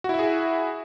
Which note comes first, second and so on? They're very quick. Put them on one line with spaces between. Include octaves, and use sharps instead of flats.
F#4 E4 E5 G#4